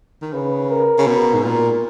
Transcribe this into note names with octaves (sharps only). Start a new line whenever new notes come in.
D#3
C#3 B4
A#4
C#3
B2 A#4
G#2
A#2 A#4